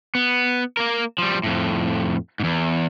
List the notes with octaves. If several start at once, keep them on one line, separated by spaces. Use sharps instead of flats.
B3
A#3 A#4
F3 G3
F2 A2
E2 G#2